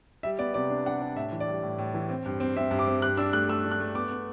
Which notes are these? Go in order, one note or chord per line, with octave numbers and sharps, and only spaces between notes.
G3 E5
B3 D5
C3 D5
D4
D4 F#5
D4
A2 E5
E3
D5
G3
A2
A2
E3
C4
G2
C4
C4 E5
G2
D6
C4
G2 F#6
D4 E6
A3 F#6
A3 E6
D4
F#6
A3
B3 D6
B3